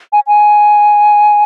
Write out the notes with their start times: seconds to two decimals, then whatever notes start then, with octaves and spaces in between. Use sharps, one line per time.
0.13 G#5
0.28 G#5